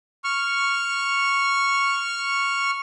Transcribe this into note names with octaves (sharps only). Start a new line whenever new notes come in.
C#6 F6